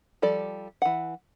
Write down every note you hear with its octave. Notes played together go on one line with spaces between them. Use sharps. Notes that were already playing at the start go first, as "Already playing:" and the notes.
F3 G3 A4 D5
E3 F#5